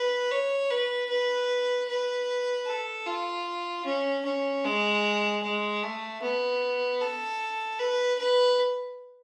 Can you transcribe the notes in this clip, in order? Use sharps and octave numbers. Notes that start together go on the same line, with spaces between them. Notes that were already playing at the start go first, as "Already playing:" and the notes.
Already playing: B4
C#5
B4
B4
B4
A4
F4
C#4
C#4
G#3
G#3
A3
B3
A4
B4
B4